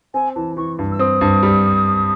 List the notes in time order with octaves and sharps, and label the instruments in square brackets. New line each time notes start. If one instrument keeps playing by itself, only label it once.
[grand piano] C4 [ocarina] G#5
[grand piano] E3 [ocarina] A5
[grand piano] E3 [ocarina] C#6
[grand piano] G2
[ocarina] E6
[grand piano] C4 [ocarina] D#6
[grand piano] G2
G3